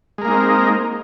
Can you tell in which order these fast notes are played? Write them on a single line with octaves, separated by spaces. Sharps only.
G#3 A#4 A#3 D#4 C4